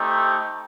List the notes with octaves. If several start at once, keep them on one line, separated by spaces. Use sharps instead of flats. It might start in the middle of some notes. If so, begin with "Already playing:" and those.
Already playing: A3 C4 D#4 G4